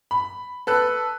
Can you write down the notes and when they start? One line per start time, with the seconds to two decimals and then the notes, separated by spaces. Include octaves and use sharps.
0.11 B5
0.67 A4 B4 F#6